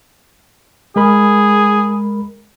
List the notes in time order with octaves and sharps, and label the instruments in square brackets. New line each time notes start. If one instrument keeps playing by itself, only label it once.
[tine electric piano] G#3 A#4 B5 [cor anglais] G#4